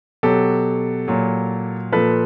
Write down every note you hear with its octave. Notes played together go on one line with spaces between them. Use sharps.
B2 F#3 G4 A4
A#2 F#3
A#2 F3 A4 B4